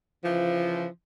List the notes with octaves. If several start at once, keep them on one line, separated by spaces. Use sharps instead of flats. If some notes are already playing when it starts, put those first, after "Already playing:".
C#3 E3 F3